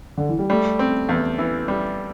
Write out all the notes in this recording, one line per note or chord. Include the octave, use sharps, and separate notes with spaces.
D3
E3
G3
G3 A3
C4
E2
E3
G3